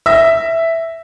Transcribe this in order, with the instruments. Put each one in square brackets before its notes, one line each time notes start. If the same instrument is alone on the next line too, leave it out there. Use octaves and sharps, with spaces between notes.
[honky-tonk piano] E5 [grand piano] E6 A#6